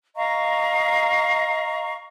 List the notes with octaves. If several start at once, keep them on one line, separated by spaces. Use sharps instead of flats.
D#5 F5 A#5 C#6